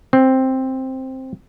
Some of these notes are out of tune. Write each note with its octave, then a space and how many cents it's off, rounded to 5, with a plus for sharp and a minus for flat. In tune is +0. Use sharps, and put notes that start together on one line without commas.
C4 +5